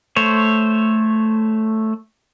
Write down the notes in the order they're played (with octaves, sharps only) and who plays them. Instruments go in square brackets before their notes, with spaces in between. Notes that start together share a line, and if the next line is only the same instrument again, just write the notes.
[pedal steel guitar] A3 C5 C#5